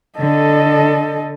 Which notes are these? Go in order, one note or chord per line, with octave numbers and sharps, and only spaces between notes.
D3 A4 D#5